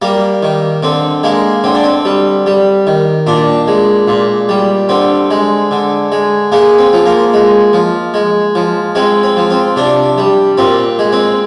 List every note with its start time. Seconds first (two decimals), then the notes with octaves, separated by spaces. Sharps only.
0.02 G3 A#3
0.43 D#3
0.83 D3 C4
1.23 G#3 A#3
1.64 D3 C4
1.75 D4
1.84 C4
2.05 G3
2.46 G3
2.87 D#3
3.27 A#2 D4
3.68 G#3
4.08 A#2
4.49 G3
4.89 D3 C4
5.31 G#3
5.71 D3
6.12 G#3
6.52 G#3 A#3
6.78 C4
6.93 F3
7.06 A#3
7.34 G#3
7.73 F3
8.14 G#3
8.55 F3
8.95 G#3 C4
9.23 C4
9.37 F3
9.50 C4
9.76 C3 D4
10.18 G3
10.58 A#2 C4
10.99 G#3
11.13 C4